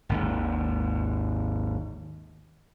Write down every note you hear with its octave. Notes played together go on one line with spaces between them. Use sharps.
G#1 D#2 G#2